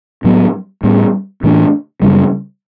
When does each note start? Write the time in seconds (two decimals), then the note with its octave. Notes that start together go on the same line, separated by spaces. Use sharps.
0.24 A2 F#3 B3
0.83 A2 G3 B3
1.43 A2 E3 A3 D4
2.02 F#2 C#3 G3